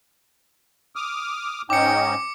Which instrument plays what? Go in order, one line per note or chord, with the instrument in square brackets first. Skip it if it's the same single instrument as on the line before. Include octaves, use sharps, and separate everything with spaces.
[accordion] D6 D#6 F6
[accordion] G#2 C#4 D#4 [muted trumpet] G5 [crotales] D6 C#7